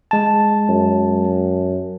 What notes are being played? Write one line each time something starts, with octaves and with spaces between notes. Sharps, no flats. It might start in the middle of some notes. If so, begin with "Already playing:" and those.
G#3 A5
F#2